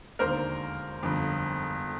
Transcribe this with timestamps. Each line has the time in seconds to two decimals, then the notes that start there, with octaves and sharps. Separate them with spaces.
0.19 E1 D#2 D3 A#4 C5
1.02 G1 F2 D3